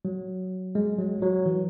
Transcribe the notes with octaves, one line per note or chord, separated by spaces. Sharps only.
F#3
G#3
F#3
F#3
E3